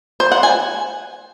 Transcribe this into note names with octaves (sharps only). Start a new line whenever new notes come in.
C5
F#5
G#5